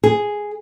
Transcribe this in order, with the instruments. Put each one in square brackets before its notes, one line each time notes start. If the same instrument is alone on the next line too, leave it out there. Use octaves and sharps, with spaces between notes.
[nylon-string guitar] G#4